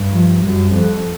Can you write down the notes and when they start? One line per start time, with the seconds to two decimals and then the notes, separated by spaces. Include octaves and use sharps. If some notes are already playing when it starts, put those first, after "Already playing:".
Already playing: G2
0.14 F3
0.43 F#2 G3
0.73 F2